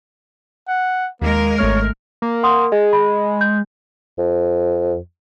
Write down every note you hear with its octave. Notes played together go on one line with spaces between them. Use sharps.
F#5
D#2 G#3 A#3 A#4
G#1 A3 C#5 F6
A#3
F#5 C6 D#6
G#3 D#5
B5
G6
F2